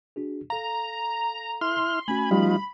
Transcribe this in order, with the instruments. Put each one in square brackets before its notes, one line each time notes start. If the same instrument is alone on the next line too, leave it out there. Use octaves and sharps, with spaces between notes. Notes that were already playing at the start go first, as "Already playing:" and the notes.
[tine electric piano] D4 F#4 G#4
[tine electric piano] A4 F5 [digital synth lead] A#5
[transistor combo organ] E4 F6 [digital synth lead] C6
[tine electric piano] A3 C#4 F#4 [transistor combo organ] G#5 [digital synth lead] B5
[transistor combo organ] F3 D#4 F4 [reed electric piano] G3